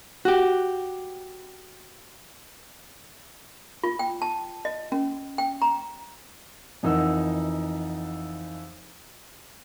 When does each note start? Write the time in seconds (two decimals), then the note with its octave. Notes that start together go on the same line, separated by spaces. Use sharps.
0.25 F#4 G4
3.84 F4
3.99 G5
4.22 A5
4.65 D#5
4.92 C#4
5.38 G5
5.62 A#5
6.83 F2 E3 D#4 A#4 F#5 E6